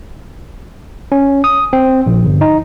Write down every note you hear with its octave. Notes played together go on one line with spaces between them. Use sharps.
C#4
D#6
C4
A#1
G1
D#4